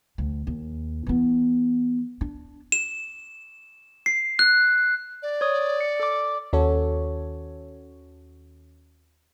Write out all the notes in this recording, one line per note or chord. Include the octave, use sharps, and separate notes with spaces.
D2
D#2
E3 B3
D4
E7
C7
F#6
D5
C#5 D#6
C#7
A4 D6
D#2 C#4 F#4 A4 C#5